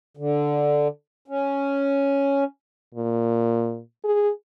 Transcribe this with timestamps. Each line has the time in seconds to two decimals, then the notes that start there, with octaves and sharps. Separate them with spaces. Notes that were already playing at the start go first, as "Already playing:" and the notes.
0.17 D3
1.28 C#4
2.95 A#2
4.04 G#4